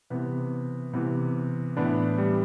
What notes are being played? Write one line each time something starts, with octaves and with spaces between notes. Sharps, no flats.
C3 E3 B3
C3 E3 B3
A2 E3 B3 D4 E4
G3